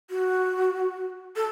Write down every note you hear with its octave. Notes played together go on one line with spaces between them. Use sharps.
F#4
A4